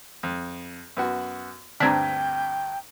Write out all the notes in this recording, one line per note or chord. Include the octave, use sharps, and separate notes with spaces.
F2
F#2 B3 F#4
D2 G2 C4 D4 G5 A#5 G#6 B6